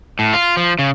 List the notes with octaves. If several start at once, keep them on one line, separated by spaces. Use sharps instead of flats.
A2
F4
F3
C#3